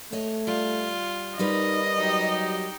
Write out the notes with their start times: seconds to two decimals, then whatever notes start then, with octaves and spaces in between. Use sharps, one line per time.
0.12 A3 C#5 D#5
0.47 G3 F4
1.39 G3 D#4 A#4 B4 D#5
1.98 F#3 D#4 G4